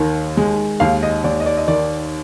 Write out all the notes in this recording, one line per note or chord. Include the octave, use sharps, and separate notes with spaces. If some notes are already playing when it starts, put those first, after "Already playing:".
Already playing: D#2 D#3
G#3
D#2 F5
D#5
D#2 D5
D#5
D5
D#5
D#3 D5